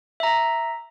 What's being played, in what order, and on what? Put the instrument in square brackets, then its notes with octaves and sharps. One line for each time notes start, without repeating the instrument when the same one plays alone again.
[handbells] E5 A#5